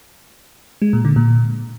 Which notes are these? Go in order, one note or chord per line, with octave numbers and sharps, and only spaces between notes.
G#3
A#2
D3
A#2